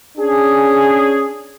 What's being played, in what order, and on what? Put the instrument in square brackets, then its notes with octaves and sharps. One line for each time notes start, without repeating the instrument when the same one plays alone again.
[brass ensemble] C#4 D4 G#4